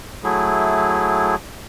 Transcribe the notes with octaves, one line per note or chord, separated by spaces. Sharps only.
F#3 A3 E4 G#4